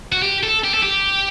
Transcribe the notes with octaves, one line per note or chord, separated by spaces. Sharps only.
F#4
G4
A4
G4
A4
G4